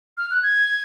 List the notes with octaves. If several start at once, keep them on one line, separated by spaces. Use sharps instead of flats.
F6
F#6
G#6